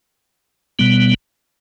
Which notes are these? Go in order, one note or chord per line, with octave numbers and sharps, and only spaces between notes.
B2 G3 B3